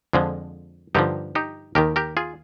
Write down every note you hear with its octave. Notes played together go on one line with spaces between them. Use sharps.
F2 D3 F3 G#3
G2 D3 F3 D#4 G4
D#4 G4
D#2 D#3 G4 A#4
G4 A#4
F4 G#4